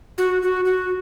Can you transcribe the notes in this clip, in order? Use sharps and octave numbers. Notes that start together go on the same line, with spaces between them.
F#4
F#4
F#4